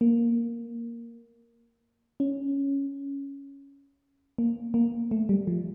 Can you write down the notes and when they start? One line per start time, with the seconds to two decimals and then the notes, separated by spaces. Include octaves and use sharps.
0.01 A#3
2.20 C#4
4.38 A#3
4.74 A#3
5.11 A3
5.29 G3
5.47 F3